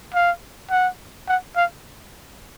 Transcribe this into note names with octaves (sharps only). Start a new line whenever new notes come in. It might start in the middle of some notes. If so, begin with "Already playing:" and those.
F5
F#5
F#5
F5